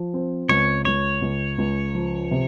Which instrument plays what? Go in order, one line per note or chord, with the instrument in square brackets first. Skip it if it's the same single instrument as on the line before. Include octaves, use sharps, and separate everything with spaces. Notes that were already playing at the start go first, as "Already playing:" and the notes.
Already playing: [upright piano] F3
C4
[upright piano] C#2 [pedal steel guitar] C#5
[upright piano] C#2 [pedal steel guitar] C#5
[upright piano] C#2
C#2
F3
C3